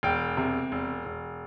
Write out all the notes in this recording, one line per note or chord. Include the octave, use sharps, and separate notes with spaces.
E1 G5
C3
E1
E1